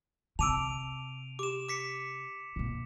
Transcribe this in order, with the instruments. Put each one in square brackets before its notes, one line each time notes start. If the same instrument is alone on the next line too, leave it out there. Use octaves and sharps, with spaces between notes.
[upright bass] C3 [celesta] A5 D6 E6 [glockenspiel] D7 D#7 F7
[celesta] G4 [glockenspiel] D6 E7
[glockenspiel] D6 B6 C#7
[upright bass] B2 A#3